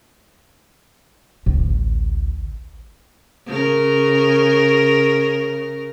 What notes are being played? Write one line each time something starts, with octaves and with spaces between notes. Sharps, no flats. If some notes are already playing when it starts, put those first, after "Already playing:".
A1 D2
C#3 A#4